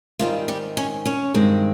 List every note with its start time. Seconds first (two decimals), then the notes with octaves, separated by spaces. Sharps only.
0.19 G#2 D#3 G3 C4 F4
0.48 G3 G4
0.77 C#4 C#5
1.05 C#4 C#5
1.34 G2 D#3 G#3 C4